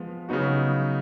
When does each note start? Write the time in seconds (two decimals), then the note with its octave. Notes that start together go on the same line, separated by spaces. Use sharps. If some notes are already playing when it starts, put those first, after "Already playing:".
Already playing: F3 G#3 B3
0.29 C#3 F#3 B3 D#4 F#4